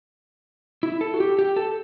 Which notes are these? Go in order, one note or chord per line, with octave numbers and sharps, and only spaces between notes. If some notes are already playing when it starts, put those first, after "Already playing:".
E4
A4
F#4
G4
G4
A4